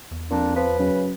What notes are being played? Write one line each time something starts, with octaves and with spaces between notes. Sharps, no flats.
E2
F2 A#2 D4
F3 B4
F#2 C#3